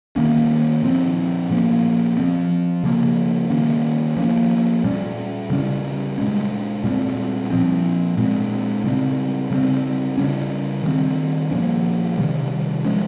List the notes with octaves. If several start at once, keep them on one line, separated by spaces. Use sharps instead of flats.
D#3 A#3 C#4
A#2 F3 C4
A#2 F3 A#3 C#4
F3 C4
C#3 F3 A#3
D#3 A#3 C#4
F3 A#3 C#4
A#2 G3 C#4
C#3 G3 C#4
A#2 G#3 C#4
A#2 G3 C4
A#2 F3 C4
A#2 G#3 C4
C#3 G3 C4
C#3 G3 C4
C#3 G3 C#4
D#3 G3 C4
A#2 F3 A#3 C#4
C3 D#3 G3
F3 G#3 C#4